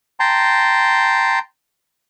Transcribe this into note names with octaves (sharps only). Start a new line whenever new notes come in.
G5 A5 A#5 C6